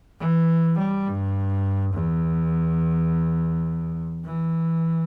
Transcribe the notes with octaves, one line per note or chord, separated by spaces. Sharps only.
E3
G3
G2
E2
E3